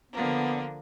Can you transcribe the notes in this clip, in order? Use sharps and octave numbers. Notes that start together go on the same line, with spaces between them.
D3 F3 A#3 B3